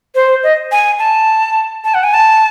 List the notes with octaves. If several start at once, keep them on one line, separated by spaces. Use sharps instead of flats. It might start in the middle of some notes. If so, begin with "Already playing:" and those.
C5
D#5
G#5
A5
A5
F#5
G#5
A5